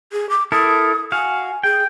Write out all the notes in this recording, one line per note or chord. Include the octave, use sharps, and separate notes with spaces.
G#4
D6
E4 A4 A#4 D#6
F#4 F5 G#5
G#4 G5